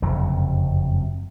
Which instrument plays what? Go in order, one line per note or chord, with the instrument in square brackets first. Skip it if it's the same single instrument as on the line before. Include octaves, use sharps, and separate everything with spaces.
[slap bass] F#1 F2 C3 F#3